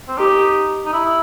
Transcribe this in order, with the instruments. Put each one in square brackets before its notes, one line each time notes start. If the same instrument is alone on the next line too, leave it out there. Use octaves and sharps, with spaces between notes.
[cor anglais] C4
[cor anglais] D#4 [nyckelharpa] G4
[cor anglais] D#4
E4